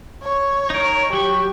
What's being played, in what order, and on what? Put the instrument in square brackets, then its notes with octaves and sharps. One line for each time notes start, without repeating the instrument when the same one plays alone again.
[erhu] C#5
[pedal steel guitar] D#4 A#4
[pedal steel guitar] F#3 C#6 [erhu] G4